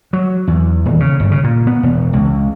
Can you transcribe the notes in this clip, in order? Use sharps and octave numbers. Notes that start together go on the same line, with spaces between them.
F#3
E2
D#1
C#3
G1
C#3
A#2
B3
E1
C#2